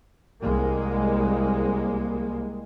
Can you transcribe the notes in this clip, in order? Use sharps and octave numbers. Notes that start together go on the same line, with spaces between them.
C2 G#3 A#3